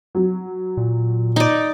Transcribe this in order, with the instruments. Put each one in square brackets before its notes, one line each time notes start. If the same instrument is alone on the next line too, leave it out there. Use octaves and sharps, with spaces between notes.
[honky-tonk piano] F#3
[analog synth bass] A#2
[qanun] D#4 D5